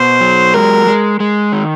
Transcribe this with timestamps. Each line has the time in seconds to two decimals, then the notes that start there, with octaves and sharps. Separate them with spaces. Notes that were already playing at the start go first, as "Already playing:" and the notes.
Already playing: B2 C5
0.21 F#3
0.54 G#3 A#4
0.87 G#3
1.20 G#3
1.52 D#3